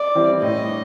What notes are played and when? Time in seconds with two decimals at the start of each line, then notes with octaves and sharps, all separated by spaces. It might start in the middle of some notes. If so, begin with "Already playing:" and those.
Already playing: D5
0.15 E3 G3 C4 E4
0.42 A2 D#5
0.68 D4